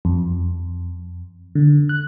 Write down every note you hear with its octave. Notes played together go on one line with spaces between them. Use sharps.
F2
D3
F#6